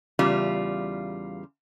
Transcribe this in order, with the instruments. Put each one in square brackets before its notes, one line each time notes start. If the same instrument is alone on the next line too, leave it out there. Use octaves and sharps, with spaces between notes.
[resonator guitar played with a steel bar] E2 C#3 G3 F4